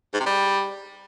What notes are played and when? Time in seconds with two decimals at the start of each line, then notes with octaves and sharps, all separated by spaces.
0.13 G#2
0.20 C3
0.26 G3